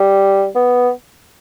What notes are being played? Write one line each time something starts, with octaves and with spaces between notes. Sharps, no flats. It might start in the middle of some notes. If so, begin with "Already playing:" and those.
Already playing: G3
B3